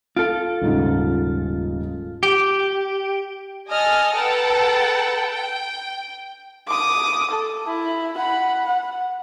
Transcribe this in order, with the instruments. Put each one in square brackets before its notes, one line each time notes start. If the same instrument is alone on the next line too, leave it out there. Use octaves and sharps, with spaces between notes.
[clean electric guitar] F4 A4 [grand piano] D7
[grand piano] D#1 G#2 C#3
[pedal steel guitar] G4
[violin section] A4 D#5 G#5 D#6 F6
A4 B4 F#5 G5 A5 A#5
G5
[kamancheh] D6 D#6
A4
E4
F#5 B5
F#5